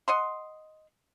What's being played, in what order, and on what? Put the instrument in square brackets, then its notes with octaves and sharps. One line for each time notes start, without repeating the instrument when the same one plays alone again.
[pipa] D#5 F#5 C6